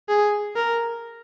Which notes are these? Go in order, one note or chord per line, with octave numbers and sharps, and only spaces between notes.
G#4
A#4